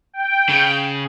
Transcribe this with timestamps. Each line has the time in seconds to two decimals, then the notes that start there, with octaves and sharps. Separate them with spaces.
0.13 G5
0.49 C#3